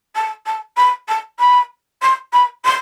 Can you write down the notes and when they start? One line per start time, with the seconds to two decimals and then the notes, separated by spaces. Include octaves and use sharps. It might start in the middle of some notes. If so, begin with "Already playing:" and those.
0.15 A5
0.46 A5
0.77 B5
1.08 A5
1.39 B5
2.02 C6
2.33 B5
2.64 C6